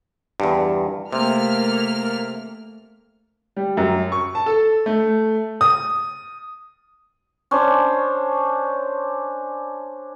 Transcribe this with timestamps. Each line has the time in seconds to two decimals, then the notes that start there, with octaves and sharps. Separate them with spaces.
0.40 E2 G2
1.12 C3 A3 A#3 F6
3.56 G3
3.77 F#2
4.12 C#6
4.35 A5
4.46 A4
4.86 A3
5.61 D#6
7.51 C#4 D4 C5